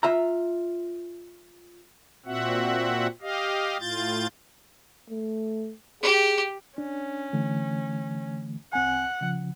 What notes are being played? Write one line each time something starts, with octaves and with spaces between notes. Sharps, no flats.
F4 E5 A#5
A#2 C4 F#4 E5 F#5
G4 D#5 F5
A2 F4 G6 A6
A3
G4 G#4
C#4 D4
D3 E3 A3
C2 C4 F#5 G#5
C#3 F3